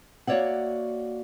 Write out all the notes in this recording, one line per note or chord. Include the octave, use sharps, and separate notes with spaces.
A#3 F#4 C#5 D5 E5 F#5